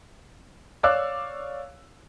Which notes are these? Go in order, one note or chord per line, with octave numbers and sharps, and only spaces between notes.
C#5 D5 F5 D6 E6 F#6